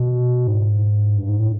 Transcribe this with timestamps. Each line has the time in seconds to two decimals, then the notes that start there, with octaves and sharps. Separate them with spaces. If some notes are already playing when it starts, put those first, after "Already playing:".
Already playing: B2
0.47 G#2
1.17 G2
1.29 G#2
1.40 A2